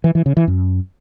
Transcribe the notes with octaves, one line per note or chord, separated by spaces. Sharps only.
E3
E3
C#3
E3
F#2